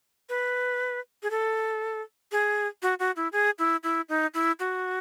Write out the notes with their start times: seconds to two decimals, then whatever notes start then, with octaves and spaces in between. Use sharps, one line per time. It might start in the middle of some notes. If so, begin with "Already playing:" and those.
0.29 B4
1.23 G#4
1.30 A4
2.32 G#4
2.82 F#4
2.99 F#4
3.16 E4
3.32 G#4
3.58 E4
3.83 E4
4.09 D#4
4.34 E4
4.60 F#4